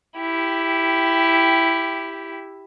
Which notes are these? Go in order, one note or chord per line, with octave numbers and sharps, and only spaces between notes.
E4 G4